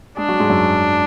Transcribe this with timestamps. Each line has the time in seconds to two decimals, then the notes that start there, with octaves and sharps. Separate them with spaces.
0.17 G#3 D4 G#4
0.28 F#3 F#4
0.40 G#2 G#3
0.50 F#2 F#3